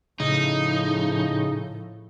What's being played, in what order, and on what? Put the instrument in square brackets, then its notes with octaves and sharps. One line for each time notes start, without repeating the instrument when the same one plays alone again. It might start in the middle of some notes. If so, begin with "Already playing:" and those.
[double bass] A2 F3 [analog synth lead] C#3 [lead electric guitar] D#4